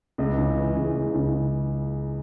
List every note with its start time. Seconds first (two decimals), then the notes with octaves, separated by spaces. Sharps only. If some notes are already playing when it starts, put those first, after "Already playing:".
0.18 C#2
0.38 C#3
0.58 E3
0.77 C#2
0.96 C#2
1.14 C#3